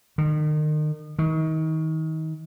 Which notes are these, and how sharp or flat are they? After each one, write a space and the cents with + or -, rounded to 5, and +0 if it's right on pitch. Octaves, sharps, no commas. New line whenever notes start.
D#3 -35
D#3 +30